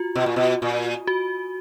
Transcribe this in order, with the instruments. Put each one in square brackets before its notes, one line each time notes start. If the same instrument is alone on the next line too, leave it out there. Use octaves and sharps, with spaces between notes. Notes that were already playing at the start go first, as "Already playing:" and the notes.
Already playing: [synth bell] F4 F#4
[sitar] B2
A#2
B2
A#2
[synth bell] F#4